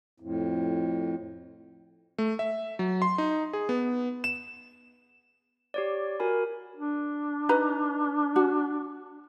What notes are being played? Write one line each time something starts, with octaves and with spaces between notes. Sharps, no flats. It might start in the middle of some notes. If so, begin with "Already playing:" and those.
F2 A2
A3
E5
F#3
C6
D#4
G#4
B3
E7
G4 C#5 D5
F#4 A#4 G#5 B5
D4
D#4 B4 A#5
F#4